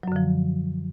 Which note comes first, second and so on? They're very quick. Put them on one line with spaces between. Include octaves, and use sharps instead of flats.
F#3 F#2 D3 F3